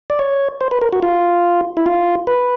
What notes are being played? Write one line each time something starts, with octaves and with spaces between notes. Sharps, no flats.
D5
C#5
C5
B4
A#4
F#4
F4
E4
F4
B4